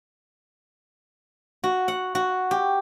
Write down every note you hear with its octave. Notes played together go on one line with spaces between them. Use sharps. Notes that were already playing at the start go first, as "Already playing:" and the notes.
F#4
F#5
F#4
G4